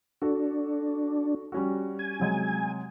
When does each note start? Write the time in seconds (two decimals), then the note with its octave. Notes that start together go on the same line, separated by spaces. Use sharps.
0.22 D4 F#4 A4
1.52 G3 C#4 F#4
1.99 G#5
2.20 C3 F#3 G#3